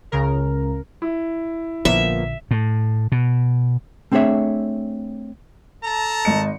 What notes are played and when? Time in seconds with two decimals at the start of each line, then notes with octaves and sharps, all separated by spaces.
0.12 C#2 C#3 A#4
1.02 E4
1.85 A#1 D3 F3 A#3 B3 E5
2.51 A2
3.12 B2
4.12 A3 C4 D4 G#4 C#5 E5
5.84 A4 A5 A#5
6.25 G#1 D#5 C#7